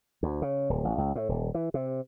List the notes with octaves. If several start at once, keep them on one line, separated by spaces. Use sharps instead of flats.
D2
C#3
D1
A1
C#2
A2
D#1
E3
C3